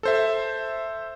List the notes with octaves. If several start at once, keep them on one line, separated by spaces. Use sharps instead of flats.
A4 C5 E5